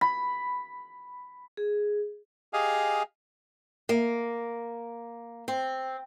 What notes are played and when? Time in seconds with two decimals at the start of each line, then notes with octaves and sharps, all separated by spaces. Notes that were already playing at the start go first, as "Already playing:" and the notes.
0.01 B5
1.57 G#4
2.53 G4 G#4 D#5 F5 G#5
3.89 A#3
5.48 C4